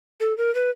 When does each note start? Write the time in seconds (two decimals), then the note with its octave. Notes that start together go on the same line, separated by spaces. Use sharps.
0.20 A4
0.38 A#4
0.55 B4